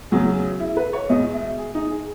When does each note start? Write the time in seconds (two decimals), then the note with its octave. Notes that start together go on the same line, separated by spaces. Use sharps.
0.11 E2 C#3 F#3 G#4
0.60 E4
0.77 B4
0.93 C#5
1.09 E2 B2 G#3 D#5
1.33 E5
1.58 G#4
1.75 D#4
1.91 G#4